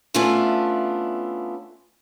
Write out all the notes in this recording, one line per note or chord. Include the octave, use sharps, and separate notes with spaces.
A3 B3 C#4 D4 E4 F4